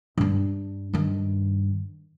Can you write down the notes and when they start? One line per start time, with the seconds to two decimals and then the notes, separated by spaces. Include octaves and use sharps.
0.18 G2 D4
0.93 G2 D#3